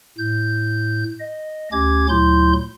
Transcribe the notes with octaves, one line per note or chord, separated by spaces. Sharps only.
A2 G6
D#5
D2 C#4 G4 D6 G#6
D2 A#2 F#3 E4 C6 G6